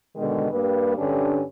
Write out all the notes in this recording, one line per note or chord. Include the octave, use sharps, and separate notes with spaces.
B2 D3 D#3 G#3
G2 G3 A#3 B4
G2 D3 C#4 D4 G4